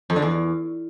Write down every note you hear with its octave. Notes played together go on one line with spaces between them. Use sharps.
F2
D3
E2